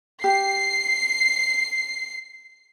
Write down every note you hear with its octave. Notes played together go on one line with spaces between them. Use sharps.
G4 C7